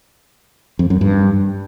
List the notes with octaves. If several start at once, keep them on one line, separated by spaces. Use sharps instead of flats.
F2
F#2
G2